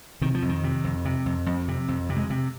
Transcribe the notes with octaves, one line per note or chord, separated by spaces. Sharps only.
C3 D#3
F3
F2
D#3
C3
F2
C3
F2
F2
C3
F2
C3
G#3
C3